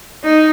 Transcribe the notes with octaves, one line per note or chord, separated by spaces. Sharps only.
D#4